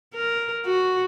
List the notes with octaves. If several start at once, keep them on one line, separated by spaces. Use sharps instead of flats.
A#4
F#4